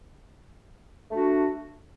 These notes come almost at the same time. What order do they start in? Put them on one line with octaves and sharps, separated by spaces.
D4 A3 F#4